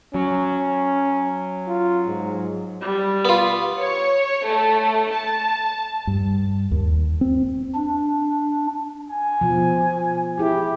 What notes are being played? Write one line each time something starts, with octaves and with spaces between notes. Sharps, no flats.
F#3 C#4
F4
G#2
G3
B3 F4
C#5
A3
A5
G2
D#2
C4
D4
G#5
B2 F3
E4 G4 G#4